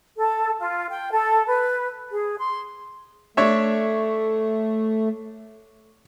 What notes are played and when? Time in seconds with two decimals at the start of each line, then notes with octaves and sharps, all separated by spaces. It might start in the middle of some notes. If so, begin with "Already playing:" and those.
0.18 A4
0.59 F4
0.91 G5
1.11 A4
1.47 B4
2.12 G#4
2.38 C6
3.37 A3 D4 C#5 E5